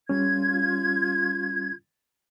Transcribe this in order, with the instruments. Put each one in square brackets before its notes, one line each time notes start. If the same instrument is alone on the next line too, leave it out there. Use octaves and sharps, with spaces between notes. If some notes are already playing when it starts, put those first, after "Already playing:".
[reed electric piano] G3 C#4 [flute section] F4 G#6